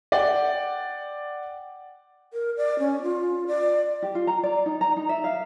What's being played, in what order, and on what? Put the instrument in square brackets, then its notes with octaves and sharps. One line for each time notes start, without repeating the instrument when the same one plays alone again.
[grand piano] D5 F#5 G5
[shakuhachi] A#4
D5
C#4
F4
D5
[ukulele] G4
F4
A#5
D5
D#4
A#5
D#4
E5
F5